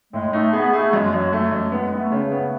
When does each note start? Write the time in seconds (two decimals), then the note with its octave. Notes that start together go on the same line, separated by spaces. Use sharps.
0.13 A2 G#3
0.33 A3 D#4
0.53 B3 G#4
0.73 A3 G#4
0.92 F#2 G#3
1.12 F#2 F#3
1.33 F#3 A3
1.52 F#2 G#3
1.72 G#3 B3
1.92 B3
1.98 A3
2.12 C#3
2.25 A3
2.32 B3